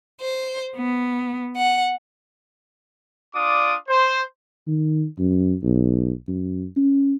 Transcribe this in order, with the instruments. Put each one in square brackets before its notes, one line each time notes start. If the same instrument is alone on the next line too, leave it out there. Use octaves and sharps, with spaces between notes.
[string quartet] C5
B3
F#5
[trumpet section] D4 F4 D5 D6 D#6
C5
[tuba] D#3
F#2
B1
F#2
C#4